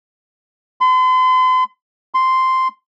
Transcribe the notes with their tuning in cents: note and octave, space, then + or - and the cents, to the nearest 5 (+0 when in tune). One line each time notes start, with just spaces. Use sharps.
C6 -40
C6 -5